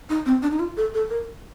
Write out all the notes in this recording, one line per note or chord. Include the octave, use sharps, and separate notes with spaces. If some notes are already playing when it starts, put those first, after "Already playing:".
D#4
C4
D4
D#4
F4
A4
A4
A#4